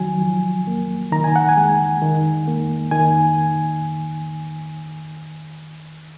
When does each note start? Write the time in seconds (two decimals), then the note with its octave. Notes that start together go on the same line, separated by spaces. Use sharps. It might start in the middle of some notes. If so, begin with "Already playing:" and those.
Already playing: D#3 F#3 G#5
0.22 F3
0.67 A#3
1.12 D#3 A#5
1.24 G#5
1.36 F#5
1.49 G#5
1.57 G#3
2.02 D#3
2.48 A#3
2.91 D#3 G#5